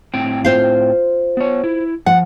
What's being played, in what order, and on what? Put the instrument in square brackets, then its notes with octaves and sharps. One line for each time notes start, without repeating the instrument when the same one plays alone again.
[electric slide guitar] A2 C4 G5
[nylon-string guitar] F4 C5 F5
[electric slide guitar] B3 C#5
E4
[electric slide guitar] F3 [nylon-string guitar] F#5